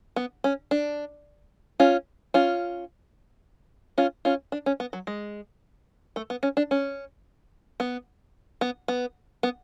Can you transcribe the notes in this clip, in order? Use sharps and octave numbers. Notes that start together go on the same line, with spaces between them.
B3
C#4
D4
C#4 F4
C#4 F4
C#4 F4
C#4 F4
D4
C#4
B3
F#3
G#3
A3
B3
C#4
D4
C#4
B3
B3
B3
B3